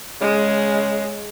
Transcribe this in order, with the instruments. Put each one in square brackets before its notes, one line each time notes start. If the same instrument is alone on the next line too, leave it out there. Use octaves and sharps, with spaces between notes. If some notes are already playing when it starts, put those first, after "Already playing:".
[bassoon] C#3 [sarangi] G#3